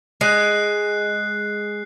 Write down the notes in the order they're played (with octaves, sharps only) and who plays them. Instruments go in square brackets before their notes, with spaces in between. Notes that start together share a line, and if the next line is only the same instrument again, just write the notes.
[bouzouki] G#3 [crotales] F#6 C7